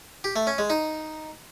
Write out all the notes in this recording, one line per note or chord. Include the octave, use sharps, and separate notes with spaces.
G4
A3
C#4
G#3
D#4